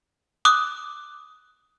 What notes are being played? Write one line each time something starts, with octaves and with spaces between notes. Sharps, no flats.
D6 D#6 F#6